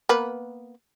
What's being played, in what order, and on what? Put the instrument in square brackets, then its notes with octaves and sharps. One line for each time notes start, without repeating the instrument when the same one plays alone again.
[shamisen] A#3 B3 B4